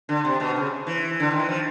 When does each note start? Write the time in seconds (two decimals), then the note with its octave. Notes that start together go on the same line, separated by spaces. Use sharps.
0.09 D3
0.25 C3
0.40 B2
0.56 C#3
0.87 E3
1.20 D3
1.30 D#3
1.39 E3
1.49 F3